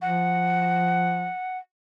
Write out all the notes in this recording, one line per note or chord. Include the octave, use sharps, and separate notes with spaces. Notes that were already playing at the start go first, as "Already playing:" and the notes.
F3 F#5